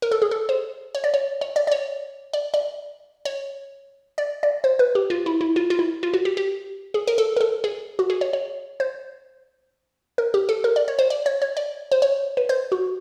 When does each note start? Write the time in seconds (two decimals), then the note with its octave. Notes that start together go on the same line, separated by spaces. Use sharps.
0.02 A#4
0.11 A4
0.22 G#4
0.31 A4
0.49 C5
0.95 C#5
1.04 D5
1.14 C#5
1.41 C#5
1.56 D5
1.67 D5
1.71 C#5
2.33 D5
2.54 D5
3.25 C#5
4.18 D5
4.43 D5
4.64 C5
4.79 B4
4.95 G4
5.10 F4
5.26 E4
5.41 E4
5.56 F4
5.70 F4
5.79 E4
6.03 F4
6.14 F#4
6.25 G4
6.37 G4
6.94 G#4
7.07 A#4
7.18 A4
7.36 A#4
7.41 A4
7.64 G#4
7.99 F#4
8.10 G#4
8.21 C#5
8.33 C#5
8.80 C5
10.18 A#4
10.34 G4
10.49 A4
10.64 A#4
10.76 D5
10.88 C#5
10.99 C5
11.10 D5
11.26 C#5
11.42 C#5
11.57 D5
11.91 C5
12.02 C#5
12.37 B4
12.49 C5
12.72 F#4